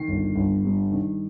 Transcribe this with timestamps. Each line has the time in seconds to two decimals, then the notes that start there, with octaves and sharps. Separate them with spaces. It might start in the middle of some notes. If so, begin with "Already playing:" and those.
Already playing: D#3 C7
0.08 G1
0.36 G1
0.64 G2
0.92 D#3